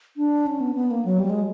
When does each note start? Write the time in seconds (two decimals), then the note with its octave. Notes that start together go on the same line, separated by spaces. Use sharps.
0.17 D4
0.46 C#4
0.61 B3
0.76 B3
0.91 A#3
1.05 F#3
1.19 G3
1.30 G#3